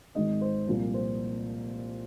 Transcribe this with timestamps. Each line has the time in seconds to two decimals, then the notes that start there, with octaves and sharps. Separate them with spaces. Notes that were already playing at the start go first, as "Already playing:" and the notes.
0.15 G#1 G#2 D#3 G#3 D#5
0.41 C5
0.67 C2 A#2 F3
0.94 C5